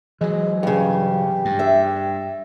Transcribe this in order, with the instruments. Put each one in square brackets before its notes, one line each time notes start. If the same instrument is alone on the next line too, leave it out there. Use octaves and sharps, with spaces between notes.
[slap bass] E3 F#3 [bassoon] G#3
[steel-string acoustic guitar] G2 C#3 [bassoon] G4
[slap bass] G2
[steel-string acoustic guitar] E5